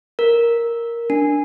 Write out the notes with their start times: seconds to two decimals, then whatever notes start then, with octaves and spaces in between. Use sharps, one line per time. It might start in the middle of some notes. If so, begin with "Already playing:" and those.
0.19 A#4
1.10 D4